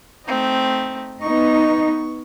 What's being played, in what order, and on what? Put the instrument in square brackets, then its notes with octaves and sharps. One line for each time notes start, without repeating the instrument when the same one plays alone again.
[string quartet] A3 C4 D#4
[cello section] B3 D#4 [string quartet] C#6